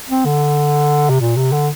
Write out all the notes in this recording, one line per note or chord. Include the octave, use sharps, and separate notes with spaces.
C4
D3
C3
A#2
C3
D3